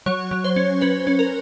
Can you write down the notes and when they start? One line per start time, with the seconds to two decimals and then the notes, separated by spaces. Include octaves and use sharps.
0.06 F#3 C#5
0.31 F#3
0.44 C5
0.56 C#4
0.81 C#4 B4
1.07 C#4
1.19 A#4